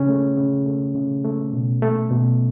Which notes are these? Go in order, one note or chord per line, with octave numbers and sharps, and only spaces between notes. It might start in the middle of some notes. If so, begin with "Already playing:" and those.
Already playing: C#3 C#4
A3
C#3
A3
C#3
A3
B2
A3
B2